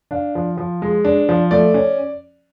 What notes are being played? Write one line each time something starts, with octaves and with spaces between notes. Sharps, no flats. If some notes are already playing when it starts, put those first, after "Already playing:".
D4 F5
F3
F3
G#3
D4
F3
A3 D5
C#4